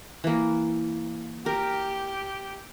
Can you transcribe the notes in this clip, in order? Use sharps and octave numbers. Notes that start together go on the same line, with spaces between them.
E3 A#3
G4 A#4